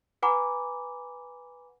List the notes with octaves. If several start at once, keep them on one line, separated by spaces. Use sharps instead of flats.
B4 F#5 G#5 A#5 B5 D6